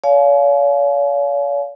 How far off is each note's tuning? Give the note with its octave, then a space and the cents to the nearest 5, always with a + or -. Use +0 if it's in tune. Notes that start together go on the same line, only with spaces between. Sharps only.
C#5 +45 F5 +0 G#5 +40